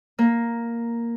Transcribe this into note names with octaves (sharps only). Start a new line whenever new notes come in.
A#3